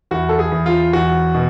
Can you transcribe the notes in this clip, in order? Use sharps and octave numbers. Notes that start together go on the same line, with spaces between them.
E2 F#4
A4
G#4
E2
F4
E2 F#4
B2